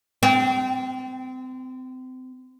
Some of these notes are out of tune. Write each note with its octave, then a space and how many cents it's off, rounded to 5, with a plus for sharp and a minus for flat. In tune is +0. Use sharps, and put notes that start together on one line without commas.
C4 -30